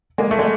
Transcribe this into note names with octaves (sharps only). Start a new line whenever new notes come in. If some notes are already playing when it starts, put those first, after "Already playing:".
G#3 A#3
A3
G#3